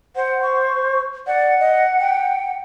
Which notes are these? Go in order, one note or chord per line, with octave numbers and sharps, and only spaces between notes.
C5 F#5
C#6
D5 F#5
D#5
G5